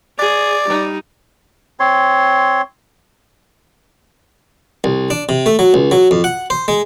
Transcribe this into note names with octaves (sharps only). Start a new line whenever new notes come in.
G#4 D5
G3 D#4
C4 C#5 C6
C2
D4
C3
A3
F#3
C#2
F#3
F2
F#5
C5
G#3